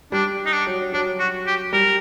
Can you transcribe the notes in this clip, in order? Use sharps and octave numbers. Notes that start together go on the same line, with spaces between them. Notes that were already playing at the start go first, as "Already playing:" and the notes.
G3 D4
D#4
D4
F#3
F#3 D4
F#4
G4
G3 A#4